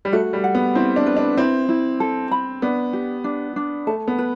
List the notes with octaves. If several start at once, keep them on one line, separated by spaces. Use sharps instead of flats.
G3
A3 F#4
G3
F#5
B3
C4 E4
D4
B4
D4
C4 E4
E4
A4
B5
B3 D4
G4
D4
D4
A3 A5
B3
B4